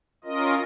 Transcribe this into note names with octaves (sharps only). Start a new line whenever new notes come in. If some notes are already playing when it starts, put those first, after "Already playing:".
C#4 F4 A#4 D#5